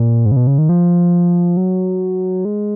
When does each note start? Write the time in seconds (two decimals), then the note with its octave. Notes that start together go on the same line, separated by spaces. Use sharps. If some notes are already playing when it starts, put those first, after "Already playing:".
Already playing: A#2
0.26 G#2
0.32 C#3
0.36 B2
0.47 C#3
0.58 D#3
0.69 F3
1.57 F#3
2.45 G#3